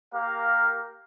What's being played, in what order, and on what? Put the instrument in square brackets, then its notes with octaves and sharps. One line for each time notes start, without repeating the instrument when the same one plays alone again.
[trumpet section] A#3 G4 A#4 F5